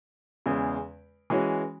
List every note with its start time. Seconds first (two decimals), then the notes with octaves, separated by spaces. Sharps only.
0.46 E2 C#3 G#3
1.30 E3 G#3 C#4 F#4